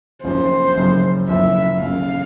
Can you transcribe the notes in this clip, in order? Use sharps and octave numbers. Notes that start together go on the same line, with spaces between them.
F#1 F#2 C#3 F3 C5
F#1 F#2 C#3 F3
F#1 F#2 C#3 F3 E5
F#1 F#2 C#3 F3 F5